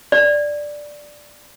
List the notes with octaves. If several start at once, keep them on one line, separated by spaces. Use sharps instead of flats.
D5